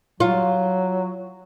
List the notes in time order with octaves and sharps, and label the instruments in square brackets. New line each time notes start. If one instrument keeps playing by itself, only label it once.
[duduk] F#3 [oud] F4